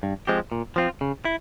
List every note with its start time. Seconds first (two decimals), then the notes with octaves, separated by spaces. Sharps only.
0.03 G2
0.27 F3 G#3 C4 G4
0.52 A#2
0.76 F3 C4 F4
1.01 C#3
1.25 E4